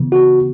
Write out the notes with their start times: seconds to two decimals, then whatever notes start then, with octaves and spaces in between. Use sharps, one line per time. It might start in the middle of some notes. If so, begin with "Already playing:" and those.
Already playing: C#3 E3 B3
0.12 F#4